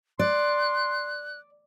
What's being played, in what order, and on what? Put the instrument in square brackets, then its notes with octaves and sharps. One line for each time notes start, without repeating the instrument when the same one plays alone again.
[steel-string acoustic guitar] D5 [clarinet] C6 [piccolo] F#6